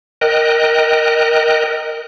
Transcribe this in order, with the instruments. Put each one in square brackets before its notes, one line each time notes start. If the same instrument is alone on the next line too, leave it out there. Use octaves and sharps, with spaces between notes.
[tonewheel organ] A#4 D#5 G5 F#6